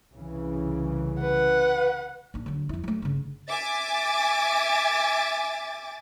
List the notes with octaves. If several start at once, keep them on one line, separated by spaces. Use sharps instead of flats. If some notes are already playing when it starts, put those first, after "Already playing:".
C2 C#3 E3
B4 F#5
A#1 D4
D3 F#3
F2 E4
F#3 A3
G1 C#3
E5 G#5 D6 A6